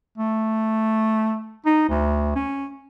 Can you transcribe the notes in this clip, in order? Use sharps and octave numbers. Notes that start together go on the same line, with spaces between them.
A3
D#4
D2
C#4